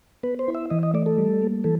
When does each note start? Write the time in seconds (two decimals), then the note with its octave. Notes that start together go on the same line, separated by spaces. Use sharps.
0.23 B3 B4
0.39 C5
0.48 E4
0.55 E5
0.70 E3 D#5
0.83 D#5
0.94 A3 D5
1.06 A4
1.18 G3
1.42 A#3
1.64 E3 A4